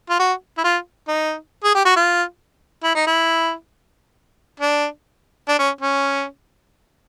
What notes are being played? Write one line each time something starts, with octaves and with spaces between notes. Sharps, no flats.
F4
F#4
E4
F4
D#4
G#4
G4
F#4
F4
E4
D#4
E4
D4
D4
C#4
C#4